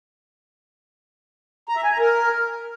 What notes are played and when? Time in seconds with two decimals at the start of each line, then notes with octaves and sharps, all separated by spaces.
1.69 A#5
1.76 E5
1.84 G#5
1.92 A#5
1.99 A#4